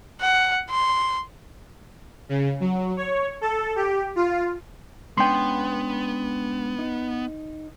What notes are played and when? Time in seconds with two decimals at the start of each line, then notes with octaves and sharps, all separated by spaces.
0.21 F#5
0.70 C6
2.29 C#3
2.60 F#3
2.97 C#5
3.41 A4
3.76 G4
4.16 F4
5.18 G#3 B3 C#4 D4 G5 C6
6.79 D#4